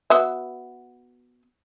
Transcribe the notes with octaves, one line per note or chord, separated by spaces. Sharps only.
B3 F#4 E5